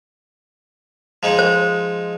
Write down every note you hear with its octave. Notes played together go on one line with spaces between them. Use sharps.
F3 G#3 D#4
C5